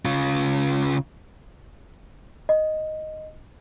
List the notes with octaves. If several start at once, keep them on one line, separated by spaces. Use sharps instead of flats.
C#3 F4
D#5